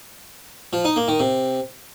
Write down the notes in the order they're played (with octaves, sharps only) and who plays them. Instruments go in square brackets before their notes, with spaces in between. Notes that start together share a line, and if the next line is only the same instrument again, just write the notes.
[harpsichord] F3
D#4
A#3
D#3
C3